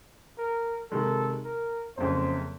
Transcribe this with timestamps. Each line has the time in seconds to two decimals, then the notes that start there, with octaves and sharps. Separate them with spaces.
0.38 A#4
0.91 C3 D#3 G#3 A4
1.45 A#4
1.97 F#1 F2 C#3 C5